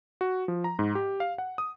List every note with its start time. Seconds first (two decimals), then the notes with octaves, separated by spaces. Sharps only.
0.21 F#4
0.48 F3
0.64 A#5
0.79 G#2
0.95 G4
1.20 F5
1.38 F#5
1.58 D#6